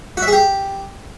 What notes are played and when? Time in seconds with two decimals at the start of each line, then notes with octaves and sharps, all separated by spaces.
0.17 F#4
0.22 E5
0.27 G#4
0.32 G4